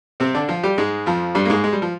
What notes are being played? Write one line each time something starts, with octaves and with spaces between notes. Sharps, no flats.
C3 C4
D3 D4
F3 F4
G3 G4
G#2 G#3
F2 F3
G2 G3
A#3
G#2 G#3
G#3
G3
F3